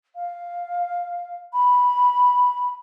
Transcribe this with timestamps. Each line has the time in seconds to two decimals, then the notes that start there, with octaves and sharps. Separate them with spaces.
0.15 F5
1.53 B5